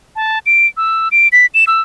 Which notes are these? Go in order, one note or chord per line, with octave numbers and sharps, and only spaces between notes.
A5
D7
E6
D7
B6
E7
E6